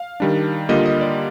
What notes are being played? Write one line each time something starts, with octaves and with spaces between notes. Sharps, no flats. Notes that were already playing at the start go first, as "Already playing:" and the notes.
Already playing: F5
D#3 G3 D4
D3 G3 A#3 F4 D#5
D#5
D5